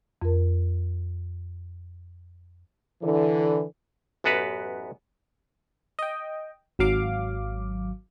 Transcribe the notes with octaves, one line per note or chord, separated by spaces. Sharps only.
F2 A#4
D3 E3
A1 F#2 B3 F#4 B4 F5
D#5 G5
G#1 F#3 F5 D6